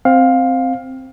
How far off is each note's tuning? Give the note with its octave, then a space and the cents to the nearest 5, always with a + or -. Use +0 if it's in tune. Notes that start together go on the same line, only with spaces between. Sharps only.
C4 +0 F5 +15